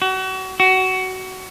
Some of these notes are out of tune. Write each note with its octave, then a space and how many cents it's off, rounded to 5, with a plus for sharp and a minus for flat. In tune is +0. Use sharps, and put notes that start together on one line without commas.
F#4 +35
F#4 +20